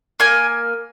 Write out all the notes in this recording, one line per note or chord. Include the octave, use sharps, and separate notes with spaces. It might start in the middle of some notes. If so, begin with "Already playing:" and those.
A#3 G#5